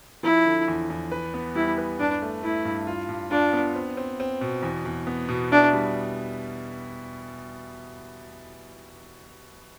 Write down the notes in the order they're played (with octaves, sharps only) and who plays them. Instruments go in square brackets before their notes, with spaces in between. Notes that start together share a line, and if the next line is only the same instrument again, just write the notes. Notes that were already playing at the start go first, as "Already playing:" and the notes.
[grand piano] F3 [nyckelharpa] E4
[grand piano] D3
E2
E2
B4
B3
[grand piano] G3 [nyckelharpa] E4
[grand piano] B4
[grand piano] G2 [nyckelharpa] D4
[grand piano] A3
[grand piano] A3 [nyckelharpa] E4
[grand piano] G2
F4
G2
[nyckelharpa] D4 [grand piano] F4
[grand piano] B3
C4
C4
C4
B2
E2
E2
B3
B2
[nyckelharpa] D4 [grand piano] E4
[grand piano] G3